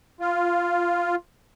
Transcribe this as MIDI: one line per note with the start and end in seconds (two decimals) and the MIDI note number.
0.20 1.15 65